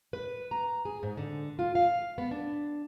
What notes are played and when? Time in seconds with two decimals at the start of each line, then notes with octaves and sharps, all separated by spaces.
0.13 B4
0.51 A#5
0.85 G#4
1.03 G#2
1.17 D3
1.59 F4
1.75 F5
2.18 B3
2.31 D4